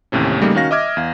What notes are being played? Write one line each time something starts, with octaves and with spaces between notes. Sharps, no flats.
A1 D#2 A2 C3 C#4
C#3 G3 A3 A#3 D#4
D#3 C#4 F#4 F5 A#6
D#5 E5 D6 F6 G#6
E2 F5